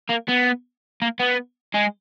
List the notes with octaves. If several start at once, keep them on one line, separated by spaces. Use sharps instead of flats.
A#3
B3
A#3
B3
G#3